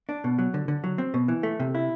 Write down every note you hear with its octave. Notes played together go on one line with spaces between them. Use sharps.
D4
B2
F#3
D3
D3
F#3
C4
B2
E3
A3
C3
E4